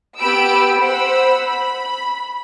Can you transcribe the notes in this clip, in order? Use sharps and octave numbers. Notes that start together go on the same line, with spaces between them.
B3 G4 B5 E6 D7
C5 F#5 B5 E6
B5